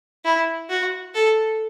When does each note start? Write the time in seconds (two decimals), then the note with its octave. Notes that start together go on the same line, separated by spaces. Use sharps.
0.25 E4
0.70 F#4
1.14 A4